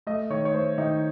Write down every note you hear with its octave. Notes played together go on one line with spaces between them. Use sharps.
A3 D#5
D#3 C#5
C#5
A3 C5
D#3 D#4